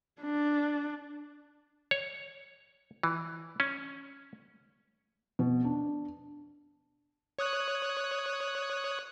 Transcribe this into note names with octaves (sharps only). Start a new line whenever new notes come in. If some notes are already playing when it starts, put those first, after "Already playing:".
D4
C#5
E3
C#4
B2
D4
C#5 D#6 F#6